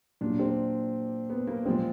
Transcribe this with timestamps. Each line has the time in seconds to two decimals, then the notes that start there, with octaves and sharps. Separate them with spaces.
0.21 A#2 F#3 D4
0.39 C4
1.30 B3
1.47 A#3
1.65 A#2 F3 G#3 C4